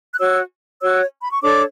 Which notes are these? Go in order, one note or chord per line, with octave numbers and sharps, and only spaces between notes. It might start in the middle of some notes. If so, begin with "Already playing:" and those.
F#6
F#4 C#5 E6
F#4 C#5 E6
B5
C#6
D4 A4 C#5 D6